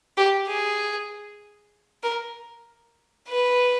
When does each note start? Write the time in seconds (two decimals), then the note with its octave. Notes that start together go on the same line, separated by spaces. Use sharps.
0.17 G4
0.48 G#4
2.03 A#4
3.28 B4